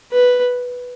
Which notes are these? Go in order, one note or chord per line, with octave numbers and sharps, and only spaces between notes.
B4